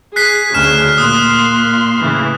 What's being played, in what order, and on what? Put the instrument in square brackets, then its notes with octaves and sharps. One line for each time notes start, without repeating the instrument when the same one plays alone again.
[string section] G#4 [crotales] F#6 B6 C7
[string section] D2 C#3 [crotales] F6 E7
[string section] A#2 C6 [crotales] D#6 F#6
[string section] A2 C#3 E3